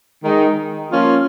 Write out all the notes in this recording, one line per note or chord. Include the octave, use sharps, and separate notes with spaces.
D#3 G#3 D#4
F3 A#3 C#4 F4